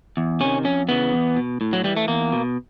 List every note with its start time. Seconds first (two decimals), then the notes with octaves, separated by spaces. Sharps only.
0.17 E2
0.40 C3 D#3 C#4
0.65 F2 C#4
0.89 C#3 E3 B3
1.13 E2
1.36 B2
1.61 A2
1.73 F#3
1.84 E3 G3
1.97 A3
2.08 E2 A#3
2.32 B2